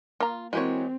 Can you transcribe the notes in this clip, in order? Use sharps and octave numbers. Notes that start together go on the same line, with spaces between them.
A#3 F4 A#5
E3 G#3 C4 F#4 G4 A#4 C#5